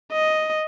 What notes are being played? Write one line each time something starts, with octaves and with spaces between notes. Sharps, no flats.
D#5